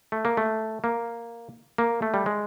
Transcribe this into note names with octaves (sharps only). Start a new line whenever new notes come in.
A3
A#3
A3
A#3
A#3
A3
G3
G#3